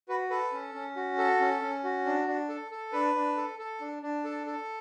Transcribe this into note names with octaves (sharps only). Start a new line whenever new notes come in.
F#4 B4
A4 B4
C#4
C#4
F#4
A4
C#4
C#4
F#4
D4
D4
A4
A4
D4 B4
D4
A4
A4
D4
D4
A4
A4